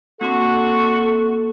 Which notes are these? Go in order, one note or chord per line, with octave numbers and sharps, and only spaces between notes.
A#3 C4 D4 F#4 A4 C6